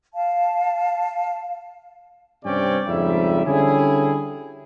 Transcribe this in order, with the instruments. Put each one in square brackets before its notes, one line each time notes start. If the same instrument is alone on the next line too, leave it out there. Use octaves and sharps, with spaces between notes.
[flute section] F5 A5
[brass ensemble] G2 C3 C4 C#4 D5 G5
F2 G#2 C#3 G3 E5
D3 G3 C#4 E4 G#4